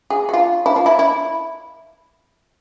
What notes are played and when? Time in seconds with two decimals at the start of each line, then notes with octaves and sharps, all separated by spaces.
0.10 G#4
0.29 F#4
0.33 F4
0.66 E4
0.76 F4
0.86 E4
0.99 E4